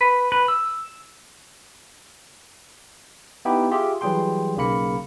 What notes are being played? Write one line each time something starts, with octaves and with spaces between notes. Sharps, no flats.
B4
B4
E6
B3 D#4 E4 G4 G5
F4 G4 G#4 E5
E3 F#3 G3 G#4 G5 C6
B1 C#3 A#3 B5 C#7